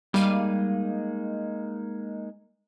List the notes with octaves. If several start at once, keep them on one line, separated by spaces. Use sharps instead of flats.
G3 G#3 A#3 D#4 F5 D#7